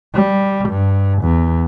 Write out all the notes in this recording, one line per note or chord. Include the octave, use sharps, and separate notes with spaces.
G3
G2
E2